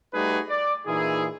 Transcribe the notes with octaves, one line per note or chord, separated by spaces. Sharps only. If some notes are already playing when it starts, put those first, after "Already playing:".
G3 A3 D#4 F#4 G#4 B4
D5
A#2 E3 D#4 E4 G#4